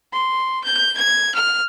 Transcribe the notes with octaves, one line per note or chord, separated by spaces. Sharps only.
C6
G6
G#6
F6